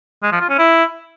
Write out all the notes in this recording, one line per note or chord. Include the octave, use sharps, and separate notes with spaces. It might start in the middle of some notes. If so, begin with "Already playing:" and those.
G#3
F3
F4
C#4
E4